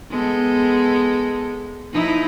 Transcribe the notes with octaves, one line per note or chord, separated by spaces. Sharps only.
G#3 B3 A4
F3 D#4 E4